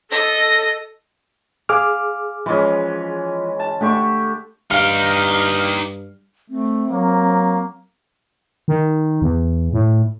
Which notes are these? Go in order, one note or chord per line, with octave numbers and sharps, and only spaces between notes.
A4 D#5 A#6
G#4 F5 D6 F6
E3 F3 G#3 C#4
A5
D3 A3 G4 C#6
G2 D#4 G4 F5 F6
A3 C4
F#3 A#3
D#3
E2
A2